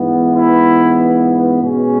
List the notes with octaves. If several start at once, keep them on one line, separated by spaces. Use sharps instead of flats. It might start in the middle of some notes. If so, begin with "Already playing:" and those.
Already playing: G#2 E3 B3
E4
B2 G#3 C#4